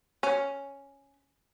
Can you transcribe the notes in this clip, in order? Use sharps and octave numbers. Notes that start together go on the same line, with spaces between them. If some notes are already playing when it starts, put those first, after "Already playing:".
C#4